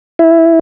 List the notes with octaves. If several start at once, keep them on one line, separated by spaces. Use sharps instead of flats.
E4